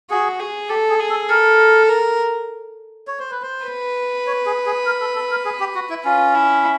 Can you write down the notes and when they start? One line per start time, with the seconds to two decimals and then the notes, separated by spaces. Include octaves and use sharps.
0.10 F#4 G#4
0.40 G#4
0.69 G4 A4
0.89 G#4
1.00 G#4
1.10 A4
1.29 A4 A#4
1.89 A#4
3.08 C#5
3.19 C5
3.31 B4
3.42 C5
3.67 B4
4.27 C#5
4.46 G#4
4.66 G#4
4.86 A#4
5.01 A4
5.15 A4
5.31 A#4
5.45 G#4
5.60 G4
5.75 F#4
5.89 E4
6.04 C#4 F4
6.34 E4